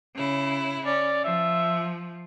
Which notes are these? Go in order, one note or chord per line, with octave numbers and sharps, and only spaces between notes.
C#3 E4
C#4 D5
F3 E5